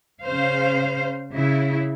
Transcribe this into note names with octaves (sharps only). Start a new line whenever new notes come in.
C#3 C5 F5
C#3 E4